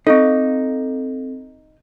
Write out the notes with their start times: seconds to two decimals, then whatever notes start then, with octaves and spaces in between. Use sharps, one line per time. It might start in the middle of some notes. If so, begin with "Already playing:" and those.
0.07 C4 D#4 A4